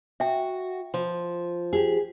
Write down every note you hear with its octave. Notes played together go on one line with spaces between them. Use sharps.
F#4 E5 G5
F3
G4 G#4